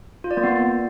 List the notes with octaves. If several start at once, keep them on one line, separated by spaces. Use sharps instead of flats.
F4
D5
A#3
B3